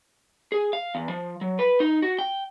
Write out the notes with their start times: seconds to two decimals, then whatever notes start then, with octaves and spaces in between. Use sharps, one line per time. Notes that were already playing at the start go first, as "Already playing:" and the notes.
0.52 G#4
0.73 F5
0.95 E2
1.09 F3
1.41 F#3
1.59 B4
1.80 D#4
2.02 F#4
2.19 G5